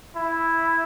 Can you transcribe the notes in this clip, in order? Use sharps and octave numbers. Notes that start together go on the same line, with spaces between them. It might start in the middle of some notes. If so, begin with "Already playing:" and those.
E4